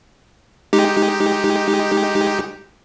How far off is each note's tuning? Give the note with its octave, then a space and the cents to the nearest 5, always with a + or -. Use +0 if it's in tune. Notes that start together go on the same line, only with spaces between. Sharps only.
G#3 +0 D#4 +0 G4 +0